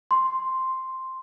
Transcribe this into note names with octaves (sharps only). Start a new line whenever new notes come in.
C6